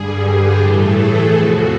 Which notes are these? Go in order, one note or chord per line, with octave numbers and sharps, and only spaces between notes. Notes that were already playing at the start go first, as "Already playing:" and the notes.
Already playing: G2 D3 G3 G#4
G4
A2 E3 A3 A4
G#4
E2 C3 F3 F#4